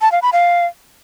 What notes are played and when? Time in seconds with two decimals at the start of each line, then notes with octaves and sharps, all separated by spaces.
0.01 A5
0.12 F5
0.22 B5
0.33 F5